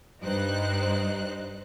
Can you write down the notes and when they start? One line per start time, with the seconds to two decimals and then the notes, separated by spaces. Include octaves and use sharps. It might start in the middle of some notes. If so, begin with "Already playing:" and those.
0.21 G2 D#4 C5 F#6